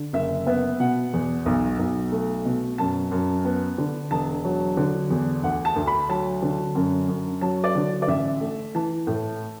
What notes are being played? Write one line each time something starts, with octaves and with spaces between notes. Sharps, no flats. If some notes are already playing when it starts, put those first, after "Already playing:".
Already playing: D3
F#1 E5
B3 E5
B2 F#5
E2
B1
B1
A3
B2
F#2 A5
F#2
B3
D3
E1 A5
F#3
D3
E2
D2 F#5
A5
D2
B5
F#3 A5
D3
F#2
F#2
F#3 A5
D5
D3
D5
A1 E5
A3
E3 A5
A2